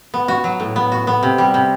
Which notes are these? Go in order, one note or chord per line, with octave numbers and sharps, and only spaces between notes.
B3
F#4
F#3
A2
B3
F#4
B3
C3
G3
C3